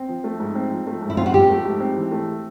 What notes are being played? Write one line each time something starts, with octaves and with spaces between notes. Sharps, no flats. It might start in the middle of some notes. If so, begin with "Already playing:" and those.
Already playing: C4
F3
A3
G#2
C4
F3
A3
G#2
E4
C4 F4
F#4
F3 G4
A3
G#2
C4
E3
A3